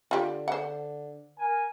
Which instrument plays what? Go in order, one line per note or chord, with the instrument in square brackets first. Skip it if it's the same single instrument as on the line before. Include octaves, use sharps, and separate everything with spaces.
[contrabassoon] D3 [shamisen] F4 G4
[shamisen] C5 F#5
[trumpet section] A#4 G#5